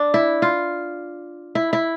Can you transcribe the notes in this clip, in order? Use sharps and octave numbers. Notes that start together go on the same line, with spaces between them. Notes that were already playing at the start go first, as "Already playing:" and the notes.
Already playing: D4
E4
F4
E4
E4